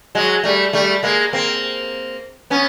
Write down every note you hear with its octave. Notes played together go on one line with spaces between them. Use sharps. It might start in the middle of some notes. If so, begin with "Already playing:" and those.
F#3 G#3
G3 A3
G3 A3
G#3 A#3
A#3 C4
B3 C#4